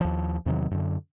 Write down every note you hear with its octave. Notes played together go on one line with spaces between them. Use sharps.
D#2 F3
E2 C3 D#3 F#3
F#2 D3